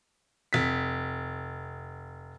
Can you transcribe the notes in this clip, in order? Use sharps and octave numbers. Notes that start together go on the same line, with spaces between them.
F1 B6